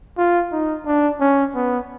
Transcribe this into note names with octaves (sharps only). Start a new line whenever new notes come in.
F4
D#4
D4
C#4
B3